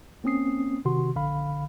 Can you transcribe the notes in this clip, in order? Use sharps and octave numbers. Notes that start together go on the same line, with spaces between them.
A#3 C4 C#4 D#6 C7
C3 D#3 F#4 C6
A#1 D3 F5 B5